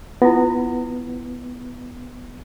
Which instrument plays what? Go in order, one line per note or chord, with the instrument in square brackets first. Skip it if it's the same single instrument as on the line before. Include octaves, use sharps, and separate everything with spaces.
[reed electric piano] B3 [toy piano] E4 F4